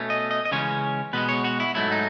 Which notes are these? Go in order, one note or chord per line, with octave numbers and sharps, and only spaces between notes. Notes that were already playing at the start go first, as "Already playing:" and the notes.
Already playing: B2 A3 C#4
D#5
D#5
D#5
C#3 E3 G#3 C#4 C#5
B2 G#3 B3 B4
C#5
F#4
E4
G#2 F#3 A3 E4
D#4